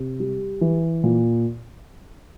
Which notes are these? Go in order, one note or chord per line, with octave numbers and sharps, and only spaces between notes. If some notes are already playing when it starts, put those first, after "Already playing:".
Already playing: C3
G3
E3
A#2